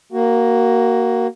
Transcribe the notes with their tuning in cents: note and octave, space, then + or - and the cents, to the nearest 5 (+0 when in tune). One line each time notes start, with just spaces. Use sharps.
A#3 +0 F#4 +20